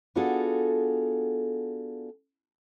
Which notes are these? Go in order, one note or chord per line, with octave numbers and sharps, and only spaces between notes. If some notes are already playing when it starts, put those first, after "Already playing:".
B3 D4 F4 F#4 G#4 A4